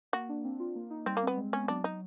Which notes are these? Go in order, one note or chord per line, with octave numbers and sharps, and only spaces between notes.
A#3 F#4
D4
C4
F4
A#3
D#4
G3 C4
A#3
B3 C4
G#3
B3 C#4
F#3 D4
D#4